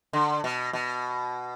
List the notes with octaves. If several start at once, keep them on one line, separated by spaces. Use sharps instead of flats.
D3
B2
B2